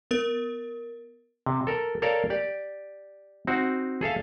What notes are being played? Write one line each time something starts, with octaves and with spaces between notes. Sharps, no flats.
B3 A#4
C3
A4 A#4
A4 A#4 C#5 D5 F5
G4 D5
C4 D#4 F#4
G#4 A4 E5 F5